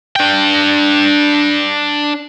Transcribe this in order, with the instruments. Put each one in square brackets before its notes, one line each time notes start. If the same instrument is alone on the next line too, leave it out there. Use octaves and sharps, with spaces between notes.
[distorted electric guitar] D4 G5